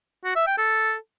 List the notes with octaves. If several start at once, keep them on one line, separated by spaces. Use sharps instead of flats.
F#4
E5
G5
A4